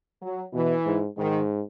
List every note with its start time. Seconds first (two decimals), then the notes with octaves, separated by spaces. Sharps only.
0.22 F#3
0.53 B2 E3
0.86 G#2
1.17 G#2 D#3